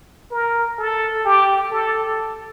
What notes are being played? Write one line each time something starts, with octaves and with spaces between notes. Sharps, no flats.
A#4
A4
G4
A4